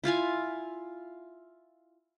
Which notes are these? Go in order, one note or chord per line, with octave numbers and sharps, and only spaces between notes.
E4 F4 F5 G#5